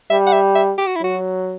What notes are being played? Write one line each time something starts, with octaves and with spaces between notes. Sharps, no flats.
G3 E5
F#5
E5
E5
G4
F#4
E4
F#3 F#4